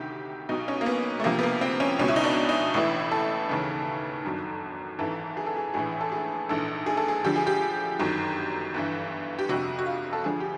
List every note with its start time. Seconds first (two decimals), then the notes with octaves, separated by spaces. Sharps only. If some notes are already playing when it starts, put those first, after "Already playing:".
Already playing: D2 C3 D#3 G4
0.49 B1 B2 D#4
0.68 C#4
0.81 A#3
0.86 B3
1.20 A3
1.24 D2 C3 F3 A#3
1.39 B3
1.43 A#3
1.61 C4
1.80 C#4
1.99 C#2 B2 C#4
2.08 E4
2.16 D#4
2.24 D4
2.49 D#4
2.74 A1 A2 E3 E4
3.12 A4
3.49 D#2 C#3 E3
4.25 G1 F#2 D#3
4.99 G#1 G#2 E3 A4
5.37 G#4
5.46 A4
5.57 G#4
5.74 A#1 A2 E3 G#4
6.01 A4
6.12 G#4
6.49 A#1 G#2 E3 A4
6.86 G#4
6.97 A4
7.08 G#4
7.24 D2 D3 F3 G4
7.36 G#4
7.47 G4
7.99 G1 F#2 D#3
8.74 G1 G2 E3
9.39 G4
9.49 G1 F2 C3 F#4
9.79 F#4
9.86 F4
10.13 A4
10.24 D2 D3 F3 G#4
10.40 G4